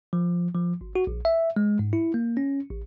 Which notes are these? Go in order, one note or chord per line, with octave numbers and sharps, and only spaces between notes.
F3
F3
G#1
F#4
A#1
E5
G#3
G#2
E4
A#3
C#4
A1